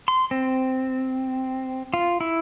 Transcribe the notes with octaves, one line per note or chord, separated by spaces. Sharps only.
C6
C4
F4
E4